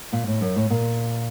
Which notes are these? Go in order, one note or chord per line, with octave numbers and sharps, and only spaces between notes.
A#2
A2
F#2
A2
A#2